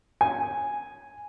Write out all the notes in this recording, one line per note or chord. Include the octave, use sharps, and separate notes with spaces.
G#5